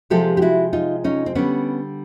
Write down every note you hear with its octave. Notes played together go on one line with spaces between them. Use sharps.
C3 F3 G#3 G4 A4
G4
E4 F#4
D#4 F4
C#4 D#4
C4
D3 G3 B3 C#4